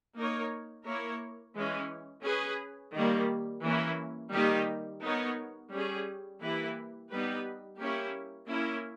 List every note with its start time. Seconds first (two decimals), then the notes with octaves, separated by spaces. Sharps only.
0.17 A#3 D#4 A#4 C#5
0.86 A#3 E4 A#4 C#5
1.56 E3 G#3 C#4
2.25 C#4 G#4 B4
2.95 D#3 G3 A#3
3.64 E3 A#3 C#4 E4
4.34 D#3 G3 A#3 D#4 G4
5.03 B3 D#4 A#4 C#5
5.72 G3 C#4 G#4
6.41 E3 A#3 E4 G4 B4
7.11 G3 B3 D#4 G4 B4
7.80 A#3 C#4 E4 G4 C#5
8.50 A#3 C#4 E4 A#4